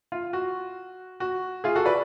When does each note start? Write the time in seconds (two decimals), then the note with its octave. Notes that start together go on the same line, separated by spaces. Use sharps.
0.12 F4
0.33 F#4
1.20 F#4
1.64 F4 G#4
1.76 F#4 A4
1.85 B4 D5